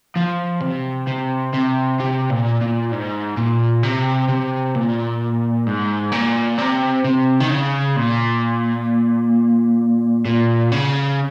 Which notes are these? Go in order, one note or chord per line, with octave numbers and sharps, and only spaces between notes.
F3
C3
C3
C3
C3
A#2
A#2
G#2
A#2
C3
C3
A#2
G#2
A#2
C3
C3
D#3
C#3
A#2
A#2
C#3